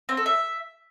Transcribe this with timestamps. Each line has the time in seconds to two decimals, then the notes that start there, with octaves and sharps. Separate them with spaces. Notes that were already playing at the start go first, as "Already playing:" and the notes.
0.09 C4
0.17 A4
0.26 E5